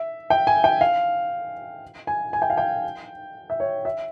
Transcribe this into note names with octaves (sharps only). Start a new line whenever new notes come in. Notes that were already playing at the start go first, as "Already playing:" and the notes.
Already playing: E5
G5
G#5
G5
F5
G#5
G#5
G5
F5
G5
E5
C#5
E5